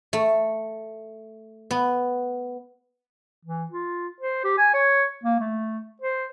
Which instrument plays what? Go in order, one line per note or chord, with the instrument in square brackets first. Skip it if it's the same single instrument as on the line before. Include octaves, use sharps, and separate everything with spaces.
[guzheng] A3
B3
[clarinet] E3
F4
C5
G4
G#5
C#5
A#3
A3
C5